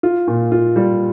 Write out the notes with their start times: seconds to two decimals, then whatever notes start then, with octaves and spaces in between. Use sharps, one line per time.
0.03 F4
0.28 A#2
0.52 F4
0.76 G3